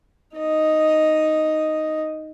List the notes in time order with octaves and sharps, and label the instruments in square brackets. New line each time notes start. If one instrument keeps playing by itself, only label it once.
[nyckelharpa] D#4 D#5